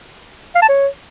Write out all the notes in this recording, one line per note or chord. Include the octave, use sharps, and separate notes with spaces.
F5
A5
C#5